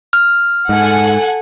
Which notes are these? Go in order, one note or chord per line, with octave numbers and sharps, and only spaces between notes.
F6
G#2 A4 F#5 G#5